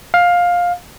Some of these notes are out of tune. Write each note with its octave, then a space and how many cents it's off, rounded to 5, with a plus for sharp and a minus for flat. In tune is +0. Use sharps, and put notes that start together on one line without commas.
F5 +15